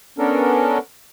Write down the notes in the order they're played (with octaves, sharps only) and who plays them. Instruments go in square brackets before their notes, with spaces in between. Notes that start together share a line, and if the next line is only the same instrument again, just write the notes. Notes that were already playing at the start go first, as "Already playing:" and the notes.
[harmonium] B3 C#4 D4 A4 A#4